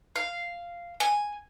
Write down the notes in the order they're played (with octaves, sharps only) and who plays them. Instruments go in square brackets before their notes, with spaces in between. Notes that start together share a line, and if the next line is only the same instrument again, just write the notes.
[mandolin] F5
G#5